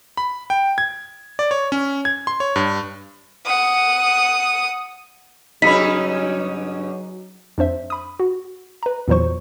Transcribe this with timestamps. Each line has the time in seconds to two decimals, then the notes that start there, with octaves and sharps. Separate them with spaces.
0.17 B5
0.50 G5
0.78 G#6
1.39 D5
1.51 C#5
1.72 C#4
2.05 G#6
2.27 C6
2.40 C#5
2.56 G2
3.46 F#5 D#6
5.62 G2 C#3 F#3 C#4 D#4 B5 B6
7.58 F2 D4 C5 E5
7.90 B5 D#6
8.20 F#4
8.83 B4 A#5
9.08 E2 A#2 E3 F#3 C5 C#6